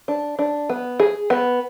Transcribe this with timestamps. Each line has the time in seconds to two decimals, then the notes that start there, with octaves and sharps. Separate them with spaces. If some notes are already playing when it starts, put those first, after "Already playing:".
0.08 D4
0.39 D4
0.70 B3
1.00 G#4
1.30 B3